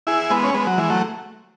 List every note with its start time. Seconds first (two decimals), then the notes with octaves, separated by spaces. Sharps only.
0.07 E4 G#4
0.30 G#3 B3
0.44 C#4
0.54 G#3 B3
0.67 F#3
0.78 E3 G#3
0.90 F#3 A3